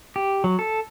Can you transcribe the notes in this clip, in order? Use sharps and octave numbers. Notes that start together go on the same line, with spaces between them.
G4
F#3
A4